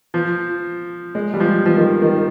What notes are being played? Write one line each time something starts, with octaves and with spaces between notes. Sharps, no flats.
F3
G#3
G3
F3
F3
D#3
D#3